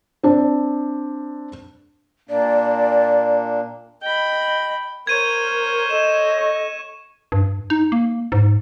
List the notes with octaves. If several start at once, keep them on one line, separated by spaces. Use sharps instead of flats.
C4 D4
A#2 A#3 D4 D5
D#5 G5 B5
A#4 C5 C#5 G#6 D#7
A4 D#5 E7
C#6
G2
D#4
A#3
G#2